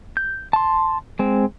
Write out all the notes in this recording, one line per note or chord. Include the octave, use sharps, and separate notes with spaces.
G6
A5 C6
G#3 C4